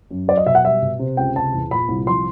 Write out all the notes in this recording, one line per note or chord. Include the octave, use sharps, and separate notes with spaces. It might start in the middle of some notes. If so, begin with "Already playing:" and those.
F#2
F#3 D5
D#5
B2 E5
F#5
G3 E5
B2
C3
C#2 G5
C3 A5
E2
A#2 B5
C2
F3 C6